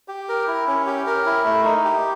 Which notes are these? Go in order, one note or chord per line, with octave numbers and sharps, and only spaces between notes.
G4
A#4
E4
C#4
G4
A#4
E4
A3
D#4
G4